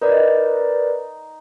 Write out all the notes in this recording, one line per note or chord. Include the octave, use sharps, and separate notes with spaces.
D#4 A#4 B4 D5